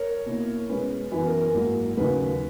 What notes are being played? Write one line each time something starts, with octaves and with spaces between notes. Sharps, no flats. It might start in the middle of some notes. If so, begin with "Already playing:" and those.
Already playing: A#4 C#5
B2 A#3 E4
B2 G#3 C#4 B4
F#2 E3 B3 B4
A#4
A#4
G#2 F#3 A#3 E4
D#2 C#3 F#3 A#3 D#4 B4